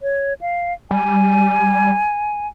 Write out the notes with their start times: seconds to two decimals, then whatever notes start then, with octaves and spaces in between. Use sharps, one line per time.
0.02 C#5
0.41 F5
0.91 G3 G#5